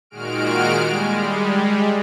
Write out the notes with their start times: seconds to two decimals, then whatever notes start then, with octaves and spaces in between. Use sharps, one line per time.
0.10 A#2 D#3 G#3 F#4 F6 D7
0.79 G3 G#3